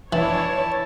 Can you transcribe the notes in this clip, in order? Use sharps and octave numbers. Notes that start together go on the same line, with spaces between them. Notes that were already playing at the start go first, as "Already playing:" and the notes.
E3 D4 E4 C#5 A5